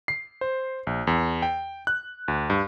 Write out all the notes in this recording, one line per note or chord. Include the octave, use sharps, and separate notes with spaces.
C7
C5
A#1
E2
G5
F#6
D2
G2